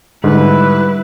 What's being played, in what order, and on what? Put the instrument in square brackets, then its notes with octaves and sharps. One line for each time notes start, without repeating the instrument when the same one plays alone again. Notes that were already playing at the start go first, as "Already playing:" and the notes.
[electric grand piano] G#2 [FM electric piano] D3 [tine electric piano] G3 [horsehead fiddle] E4 B4